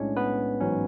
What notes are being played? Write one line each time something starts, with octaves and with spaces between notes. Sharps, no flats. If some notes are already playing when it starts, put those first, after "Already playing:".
Already playing: B1 A2 G#3 C#4 D4 C#5
B3 B4
A1 G#2 F#3 C#4